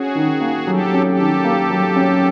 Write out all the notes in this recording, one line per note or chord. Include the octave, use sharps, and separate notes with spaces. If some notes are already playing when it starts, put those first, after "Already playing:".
Already playing: C#4 F#4 G#4
D#3
A#3
F#3 G4 A4
C#4
G4 A4
D#3
A#3
F#3
C#4